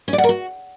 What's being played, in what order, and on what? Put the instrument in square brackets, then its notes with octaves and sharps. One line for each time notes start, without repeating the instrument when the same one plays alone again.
[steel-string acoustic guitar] C#4
D5
F#5
A#4
F#4